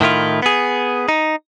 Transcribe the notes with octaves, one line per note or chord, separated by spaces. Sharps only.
A2 D#3 E4 F4
B3 G#4
D#4